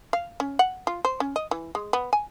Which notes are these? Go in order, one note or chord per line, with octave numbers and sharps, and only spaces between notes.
F5
C#4
F#5
F4
C5
C#4
D#5
E3
G#3
B3
G#5